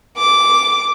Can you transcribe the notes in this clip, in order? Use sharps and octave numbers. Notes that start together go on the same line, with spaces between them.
D6